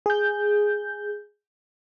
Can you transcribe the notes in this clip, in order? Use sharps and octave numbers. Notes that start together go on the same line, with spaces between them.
G#4 G6